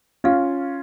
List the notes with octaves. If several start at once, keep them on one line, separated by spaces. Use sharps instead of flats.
C#4 F4 F5